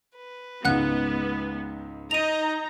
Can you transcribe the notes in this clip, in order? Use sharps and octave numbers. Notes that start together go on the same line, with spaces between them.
B4
C#2 G#2 B3 F#5 F#6
D#4 D#5 A#5 D#7 F7